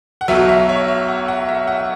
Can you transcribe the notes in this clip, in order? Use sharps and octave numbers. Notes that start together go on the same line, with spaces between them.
F#5
B1 B2 F#3 E5
E5
C#5
E5
F#5
F#5
E5
F#5